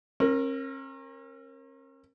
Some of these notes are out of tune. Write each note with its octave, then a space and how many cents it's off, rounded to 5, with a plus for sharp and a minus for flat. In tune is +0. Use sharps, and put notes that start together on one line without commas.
C#4 -45 A#4 +0